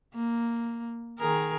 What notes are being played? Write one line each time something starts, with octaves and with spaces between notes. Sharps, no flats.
A#3
D#3 G#4 A#4